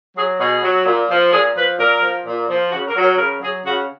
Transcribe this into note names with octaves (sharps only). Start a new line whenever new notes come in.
F#3 G#4
B2 G#4
F#3
A#2
F3
A#2 G#4
F3 B4
A#2 A#4
F3
A#2
F3
C#3 F#4
A#4
F#3
A#4
C#3 A#4
F#3 G#4
C#3 F#4